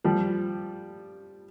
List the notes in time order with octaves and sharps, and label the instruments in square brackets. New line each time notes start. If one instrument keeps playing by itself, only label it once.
[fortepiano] F3 G3